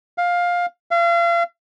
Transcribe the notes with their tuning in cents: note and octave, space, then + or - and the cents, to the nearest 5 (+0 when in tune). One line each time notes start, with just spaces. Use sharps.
F5 +15
F5 -35